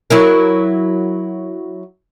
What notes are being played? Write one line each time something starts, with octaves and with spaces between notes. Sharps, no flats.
F#3 E4 A#4